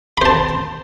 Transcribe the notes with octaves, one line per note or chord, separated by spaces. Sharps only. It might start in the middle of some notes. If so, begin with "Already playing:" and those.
C5 A5 B5